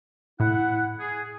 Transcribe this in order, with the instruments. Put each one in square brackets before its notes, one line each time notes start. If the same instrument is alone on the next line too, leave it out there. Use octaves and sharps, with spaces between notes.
[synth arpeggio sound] A2 [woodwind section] E4 F#5
[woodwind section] G#4